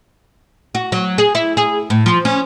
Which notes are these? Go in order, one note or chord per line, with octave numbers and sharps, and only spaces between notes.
F#4
F#3
G#4
E4
G#4
A2
F3
C#4